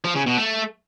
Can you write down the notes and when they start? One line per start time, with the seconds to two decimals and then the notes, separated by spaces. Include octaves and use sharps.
0.04 F3
0.15 C#3
0.26 B2
0.37 A3